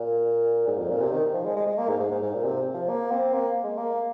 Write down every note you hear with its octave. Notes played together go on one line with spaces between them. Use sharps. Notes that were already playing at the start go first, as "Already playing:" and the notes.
Already playing: A#2
G#2
F2
A#2
C3
D#3
F3
G#3
G#3
G#3
A#3
G#2
G#2
G#2
G#2
A#2
C3
F3
A#3
C4
A#3
G#3
A#3